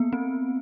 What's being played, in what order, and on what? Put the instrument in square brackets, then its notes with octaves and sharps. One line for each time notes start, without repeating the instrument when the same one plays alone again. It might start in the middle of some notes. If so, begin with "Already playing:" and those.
Already playing: [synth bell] A#3 B3
C4